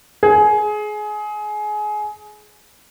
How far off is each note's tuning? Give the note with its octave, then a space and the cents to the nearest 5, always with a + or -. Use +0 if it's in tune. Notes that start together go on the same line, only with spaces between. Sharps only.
G#4 +25